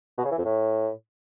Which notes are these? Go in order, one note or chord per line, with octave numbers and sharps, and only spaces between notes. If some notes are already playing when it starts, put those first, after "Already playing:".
B2
C#3
E3
F2
A2